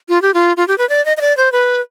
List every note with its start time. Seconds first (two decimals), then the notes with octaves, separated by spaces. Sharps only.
0.09 F4
0.22 G4
0.34 F4
0.57 F4
0.68 G4
0.78 B4
0.89 D5
1.05 D#5
1.17 D#5
1.21 D5
1.37 C5
1.52 B4